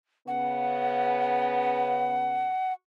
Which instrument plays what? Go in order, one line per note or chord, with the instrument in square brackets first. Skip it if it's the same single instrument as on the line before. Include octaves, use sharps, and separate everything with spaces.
[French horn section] C#3 B3 [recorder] F#5